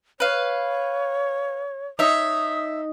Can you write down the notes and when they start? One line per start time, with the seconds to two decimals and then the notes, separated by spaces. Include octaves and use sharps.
0.20 B4 C#5 F5
1.99 D#4 C#5 E5 D#6